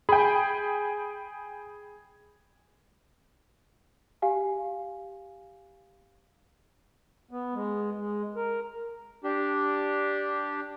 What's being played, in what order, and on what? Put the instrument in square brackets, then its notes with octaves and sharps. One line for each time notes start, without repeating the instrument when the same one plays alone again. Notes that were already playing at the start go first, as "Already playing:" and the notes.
[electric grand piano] G#4 G#5 [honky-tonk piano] G5 B5
[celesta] G4 F5 G#5
[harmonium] B3
G#3
G#3
A#4
[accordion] D4 G4